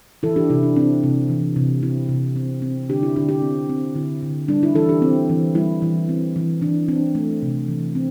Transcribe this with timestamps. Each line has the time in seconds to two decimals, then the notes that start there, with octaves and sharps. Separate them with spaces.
0.23 E3 E4 A4
0.36 D4 G4
0.50 C3 E4
0.63 D4
0.76 C4 D4
1.04 C3
1.30 E3
1.56 C3
1.83 C4 E4
2.09 C3
2.36 C4
2.62 C4
2.89 D3 D4 G4
3.03 E4
3.16 D3 D4 G4
3.29 D4 G4
3.42 C4
3.70 C4
3.95 D3 E4
4.22 D3
4.48 G3 D4
4.63 E4
4.75 E3 E4 A4
4.89 D4 G4
5.02 C4
5.29 E3
5.55 G3 E4
5.82 E3
6.09 C4
6.36 E3
6.61 E3 D4
6.88 C4 D4
7.15 A3
7.42 C3
7.68 E3
7.95 C4